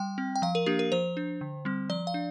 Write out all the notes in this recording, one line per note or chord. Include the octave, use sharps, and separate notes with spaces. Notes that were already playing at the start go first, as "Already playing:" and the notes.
Already playing: G3 G5
C4
G5
F3 F5
A#4
A#3 D4 G4
A#4
F3 C5
D4
D3
G3 C4
F3 D5
F5
D4